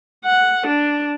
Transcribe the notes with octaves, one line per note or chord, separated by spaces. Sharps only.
F#5
D4